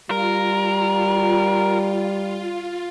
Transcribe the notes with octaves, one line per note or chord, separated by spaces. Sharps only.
G3 F4 A#4